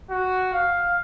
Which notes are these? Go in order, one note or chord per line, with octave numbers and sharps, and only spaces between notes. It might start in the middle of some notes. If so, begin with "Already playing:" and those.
F#4
F5